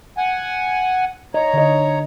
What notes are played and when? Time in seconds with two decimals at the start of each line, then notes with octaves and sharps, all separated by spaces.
0.17 F#5 G#5
1.34 C#5 D#5 A#5
1.53 D3 D#5